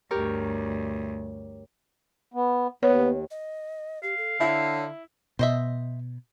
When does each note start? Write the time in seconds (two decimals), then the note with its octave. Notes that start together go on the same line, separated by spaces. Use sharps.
0.11 D2 G2 G4 A#4 C#5
2.34 B3
2.83 D#2 B3 C#5
3.31 D#5
4.03 G4 F5
4.17 A4
4.40 D3 E4 C#5
5.39 B2 C5 D#5 E5